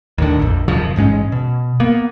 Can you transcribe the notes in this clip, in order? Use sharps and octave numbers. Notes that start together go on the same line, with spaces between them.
D#2 A2 D3
A#1 F2
D#1 F#2 C#3 F3
A1 G#2 G#3 C#4
B2
A#3 B3